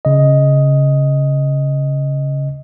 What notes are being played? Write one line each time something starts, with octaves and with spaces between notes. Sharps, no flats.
C#3 D#5